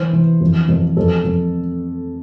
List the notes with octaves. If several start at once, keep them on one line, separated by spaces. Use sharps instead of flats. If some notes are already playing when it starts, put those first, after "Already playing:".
Already playing: E3 C5
E3
F2
F2
F2 A4
F2